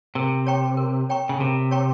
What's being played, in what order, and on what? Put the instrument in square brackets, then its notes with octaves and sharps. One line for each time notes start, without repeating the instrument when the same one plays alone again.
[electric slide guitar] C3 [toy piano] A#4
[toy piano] C#5 G5 A#5 C#6
A#4
C#5 G5 A#5 C#6
[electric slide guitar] C#3
[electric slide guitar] C3 [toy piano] A#4
[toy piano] C#5 G5 A#5 C#6